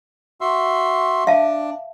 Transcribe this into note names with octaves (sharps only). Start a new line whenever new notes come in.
F#4 E5 C6
D4 E5 F5 A5